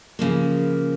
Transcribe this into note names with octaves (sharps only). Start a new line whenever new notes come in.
C#3 F3 A#3